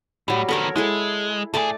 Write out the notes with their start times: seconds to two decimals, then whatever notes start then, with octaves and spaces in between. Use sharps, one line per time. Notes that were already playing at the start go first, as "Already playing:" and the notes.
0.28 A2 F#3 G3
0.49 D#3 B3 A4 A#4 C#5
0.76 G#3 E4 G#4 A4
1.54 A2 A3 G#4 D5 A5